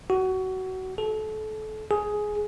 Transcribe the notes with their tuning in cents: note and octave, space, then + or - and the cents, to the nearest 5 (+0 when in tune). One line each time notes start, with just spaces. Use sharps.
F#4 +20
A4 -30
G#4 +10